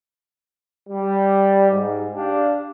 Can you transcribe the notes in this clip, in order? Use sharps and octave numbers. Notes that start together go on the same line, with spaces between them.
G3
G#2
D4 G4 F5